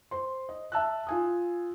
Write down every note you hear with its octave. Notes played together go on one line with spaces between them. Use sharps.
C5 C6
D#5
E5 A5 E6 F#6
F4 G#5 D#6